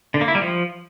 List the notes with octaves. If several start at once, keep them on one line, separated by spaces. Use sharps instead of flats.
D3
A#3
E4
G3
F3